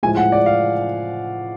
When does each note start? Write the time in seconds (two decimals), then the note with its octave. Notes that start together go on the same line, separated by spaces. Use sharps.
0.03 A2 F3 G#3 G#5
0.17 F#5
0.32 D5
0.46 F5